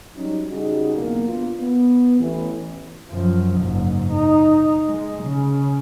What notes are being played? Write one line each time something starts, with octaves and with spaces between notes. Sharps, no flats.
F#3 G3 C#4 D#4
C#3 G3 D#4 F#4 G#4
B1 E2 A#3
B3 D4 F4
B3
A1 E3
F#2 F3
F#1 G#2
D#4
G#3
C#3